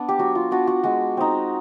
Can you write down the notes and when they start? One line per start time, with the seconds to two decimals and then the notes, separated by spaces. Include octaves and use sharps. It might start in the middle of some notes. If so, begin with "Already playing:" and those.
Already playing: B3 D4
0.09 G4
0.19 F#3 F#4
0.35 F4
0.51 B3 D4 F4 F#4
0.67 F#4
0.83 G#3 F#4
1.17 C4 D#4